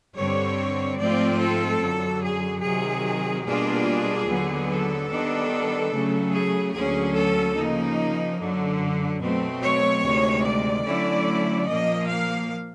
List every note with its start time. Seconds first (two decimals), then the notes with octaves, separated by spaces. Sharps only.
0.15 G2 D3 G3 C4 C#5
0.98 G#2 F3 A3 C4 F4 D5
1.39 A4
1.80 F#2 D3 F#3
2.22 G#4
2.62 C3 D#3 F#3 G#4
3.45 B2 G3 A#3 D4 F4 G#4
4.27 D#2 D3 F#3 B3
4.68 A4
5.09 D#3 G3 B3 D4
5.92 C#3 F#3 A3
6.33 G#4
6.74 D2 D3 F#3 A#3 C#4 G#4
7.15 A4
7.56 C#3 F3 A#3 D#4
8.38 F#2 D3 F#3
9.21 B2 F#3 A3 C4
9.61 C#5
10.02 D2 C3 D#3 G#3
10.44 D5
10.85 D3 F#3 A3 C#4 E4
11.68 A#2 F3 A#3 D#5
12.09 F5